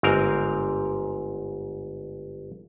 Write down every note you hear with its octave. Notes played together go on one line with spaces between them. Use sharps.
G1 G#2 C4 A#4